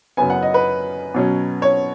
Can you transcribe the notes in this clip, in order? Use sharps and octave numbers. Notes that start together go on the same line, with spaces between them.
F#2 C#3 F#3 B3 G#5
F#5
D#5
B4
B2 F#3 C#4
C#5